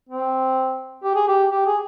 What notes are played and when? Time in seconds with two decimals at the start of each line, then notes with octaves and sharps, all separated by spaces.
0.09 C4
1.04 G4
1.15 G#4
1.28 G4
1.51 G4
1.67 G#4